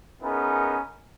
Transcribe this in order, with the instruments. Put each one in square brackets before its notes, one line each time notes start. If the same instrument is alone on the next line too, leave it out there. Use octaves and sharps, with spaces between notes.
[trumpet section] B3 C#4 D#4 E4 G#4 A#4